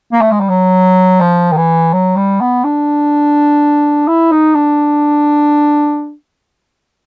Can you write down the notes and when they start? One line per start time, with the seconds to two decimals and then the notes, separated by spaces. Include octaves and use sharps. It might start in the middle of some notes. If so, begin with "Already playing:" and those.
0.12 A#3
0.21 A3
0.32 G#3
0.40 G3
0.49 F#3
1.21 F3
1.52 D#3
1.57 E3
1.93 F#3
2.17 G3
2.41 B3
2.64 D4
4.08 E4
4.32 D#4
4.55 D4